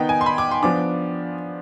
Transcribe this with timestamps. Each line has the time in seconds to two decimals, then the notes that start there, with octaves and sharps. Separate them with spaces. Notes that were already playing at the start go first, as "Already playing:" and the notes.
Already playing: D#3 B3 D#4 G5
0.09 G#5
0.21 C6
0.26 B5
0.38 D6
0.51 C6
0.62 F3 B3 D4 D6